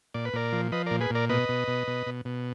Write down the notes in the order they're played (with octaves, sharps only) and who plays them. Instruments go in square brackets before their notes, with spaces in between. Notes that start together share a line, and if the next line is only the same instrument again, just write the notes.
[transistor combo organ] A#2 D5
B4
A#2 A#4 D5
F3
F3 B4 D#5
A#2 A#4 D5
G#4 B4
A#2 A#4 D5
B2 B4 D#5
B2
B2
B2
B2
B2